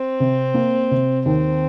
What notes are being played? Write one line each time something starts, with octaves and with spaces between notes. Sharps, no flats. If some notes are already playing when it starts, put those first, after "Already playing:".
Already playing: C4
C3
A#3
C3
D#2 C4